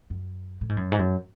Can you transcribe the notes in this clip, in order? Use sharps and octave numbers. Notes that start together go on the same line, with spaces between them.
F#2
A2
G#2
F#2
G#2
F#2